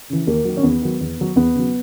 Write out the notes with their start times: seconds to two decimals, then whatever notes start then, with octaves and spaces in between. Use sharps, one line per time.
0.10 C#3 E3
0.27 D#2 A#3
0.45 D#3 F#3
0.57 C#4
0.63 E2 B3
0.81 D#3 F#3
1.01 E2
1.18 D#3 F#3
1.36 E2 B3
1.55 C#3 F#3